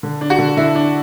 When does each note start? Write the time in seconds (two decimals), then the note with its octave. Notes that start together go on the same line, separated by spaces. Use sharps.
0.03 D3
0.21 D4
0.30 F#4
0.38 D3
0.57 D3 E4
0.75 D4